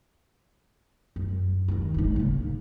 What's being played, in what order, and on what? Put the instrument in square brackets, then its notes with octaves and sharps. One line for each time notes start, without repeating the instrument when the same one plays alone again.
[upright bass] F#2
D#2 D#3
G#1 D#4
C#3 A#3